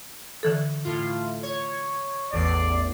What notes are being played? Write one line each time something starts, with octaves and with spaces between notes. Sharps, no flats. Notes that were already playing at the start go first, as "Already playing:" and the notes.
D3 E3 A4
A2 F4
C#5
A1 E2 D5 C7